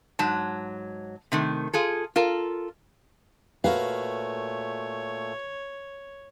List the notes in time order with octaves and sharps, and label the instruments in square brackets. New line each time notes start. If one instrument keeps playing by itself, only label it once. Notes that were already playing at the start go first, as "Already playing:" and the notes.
[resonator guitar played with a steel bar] G#2 F#3 A5
C3 D#3 A3
F4 G#4 A4
F4 A4 A#4
[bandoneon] A#2 A3 [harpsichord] F#4 A#4 B4 [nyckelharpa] C#5 [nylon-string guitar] F5